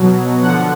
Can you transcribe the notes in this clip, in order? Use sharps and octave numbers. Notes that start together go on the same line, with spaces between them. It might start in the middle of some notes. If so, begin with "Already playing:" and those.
Already playing: B2 F#3
D3 F3 F#5